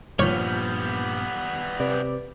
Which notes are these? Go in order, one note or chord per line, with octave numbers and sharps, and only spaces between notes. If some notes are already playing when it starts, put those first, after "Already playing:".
G2 A#2 F3 G3 B3 C#5 F6 G6
C3 B4 D5